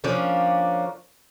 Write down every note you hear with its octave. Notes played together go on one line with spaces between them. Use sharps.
F3 A#3 C#4 D4